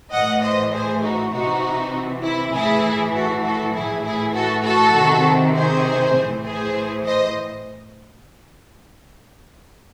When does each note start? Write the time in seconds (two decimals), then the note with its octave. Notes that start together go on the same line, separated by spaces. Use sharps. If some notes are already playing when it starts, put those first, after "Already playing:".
0.12 A2 E3 D#5 F#5
0.42 C5 D#5
0.73 G#4 C5
1.02 D#4 F#4
1.33 C3 E3 D#4 F#4
2.23 E4
2.53 A2 E3 E4 G#4
3.13 F#4 A4
3.43 F#4 A4
3.74 A2 E3 E4 G#4
4.04 E4 G#4
4.34 F#4 A4
4.64 F#4 A4
4.94 C3 D#3
5.54 G#4 C5
6.15 A2 E3
6.45 G#4 C5
7.05 C5 D#5